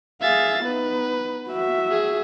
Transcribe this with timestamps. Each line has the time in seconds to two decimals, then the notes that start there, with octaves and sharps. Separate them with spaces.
0.22 G#4 E5 F5 A6
0.64 B3 D#4 B4
1.49 F#4 E5
1.91 G#4